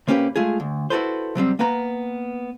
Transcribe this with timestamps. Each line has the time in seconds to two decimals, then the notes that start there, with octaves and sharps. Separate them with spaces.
0.08 C3 A#3 C#4 G4 B4
0.36 G#3 A3 F4 G#4
0.60 D2
0.90 E4 F#4 G#4 A4 B4 C5
1.35 C3 F#3 G3 C4
1.59 A#3 B3 B4 A#5